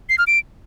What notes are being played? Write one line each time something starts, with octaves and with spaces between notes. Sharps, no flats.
C7
F6
D7